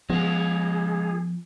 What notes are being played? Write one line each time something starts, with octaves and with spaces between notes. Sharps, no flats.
F3 G#3 B3 F4 G#4